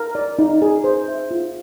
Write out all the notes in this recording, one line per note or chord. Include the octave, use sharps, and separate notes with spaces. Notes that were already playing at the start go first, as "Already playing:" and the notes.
Already playing: A#4
D5
D#4
G#4
C5
E5
F4